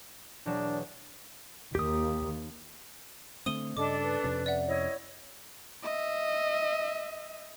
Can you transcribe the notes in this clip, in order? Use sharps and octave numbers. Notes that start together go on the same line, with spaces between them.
E1 F#3 D4 E7
D#2 G4 D#6
D3 A3 C4 D#6 D#7 G7
G2 C#3 D4 A4 D5 D#5 D6
B4
F2 C3 C#4
D5 E5 F#5
E4 C#5 D#5
D#5 E5